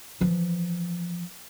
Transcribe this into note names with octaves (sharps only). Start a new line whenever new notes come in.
E3 F3